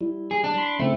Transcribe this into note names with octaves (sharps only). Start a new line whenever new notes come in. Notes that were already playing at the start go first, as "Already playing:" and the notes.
G3 E4
G#4
D4
B5 C6
C#3 A3 C4 E4